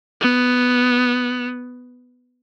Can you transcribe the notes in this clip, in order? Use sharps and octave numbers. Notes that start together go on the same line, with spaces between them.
B3